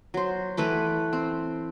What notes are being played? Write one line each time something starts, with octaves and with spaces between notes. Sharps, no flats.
F#3 C5
E3 A3 B4 D6
C4